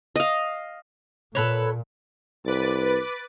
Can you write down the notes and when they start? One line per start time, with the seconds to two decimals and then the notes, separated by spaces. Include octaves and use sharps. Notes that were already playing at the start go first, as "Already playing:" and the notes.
0.16 D#5 F5
1.35 A#2 A4 B4 C#5
2.45 C2 B4 D6 A6